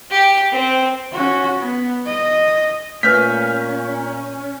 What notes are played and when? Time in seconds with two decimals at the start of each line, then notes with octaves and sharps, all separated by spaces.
0.11 G4
0.52 C4
1.12 C#4 F#4
1.58 B3
2.06 D#5
3.03 A#2 A3 C#4 B4 F6 G6 B6